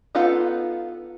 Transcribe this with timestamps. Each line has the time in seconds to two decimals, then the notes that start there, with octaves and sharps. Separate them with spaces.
0.15 B3 D#4 F4 A4 F#5